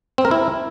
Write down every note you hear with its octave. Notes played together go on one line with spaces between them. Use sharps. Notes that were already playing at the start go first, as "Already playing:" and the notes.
C4
A#4
E4